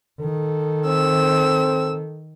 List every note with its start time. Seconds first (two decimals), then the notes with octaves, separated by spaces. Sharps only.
0.21 D#3 A4
0.87 C4 E6